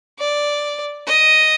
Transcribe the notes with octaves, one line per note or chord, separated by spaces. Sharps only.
D5
D#5